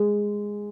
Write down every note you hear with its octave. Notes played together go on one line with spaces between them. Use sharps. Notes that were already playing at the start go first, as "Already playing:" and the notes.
Already playing: G#3